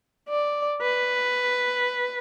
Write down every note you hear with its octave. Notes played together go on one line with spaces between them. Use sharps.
D5
B4